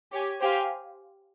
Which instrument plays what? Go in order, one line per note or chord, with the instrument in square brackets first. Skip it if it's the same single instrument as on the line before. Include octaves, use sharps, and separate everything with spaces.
[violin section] G4 C#5 G#5
G4 C5 F5 G#5